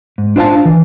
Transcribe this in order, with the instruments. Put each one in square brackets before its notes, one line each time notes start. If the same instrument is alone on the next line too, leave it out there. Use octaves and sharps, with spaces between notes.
[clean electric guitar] G#2
D4 F4 C5 E5 F5 A5
E3